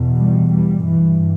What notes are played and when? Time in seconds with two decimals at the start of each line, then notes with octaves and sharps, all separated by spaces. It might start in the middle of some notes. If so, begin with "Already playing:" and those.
Already playing: E2 B2
0.17 G3
0.50 G3
0.83 G2 E3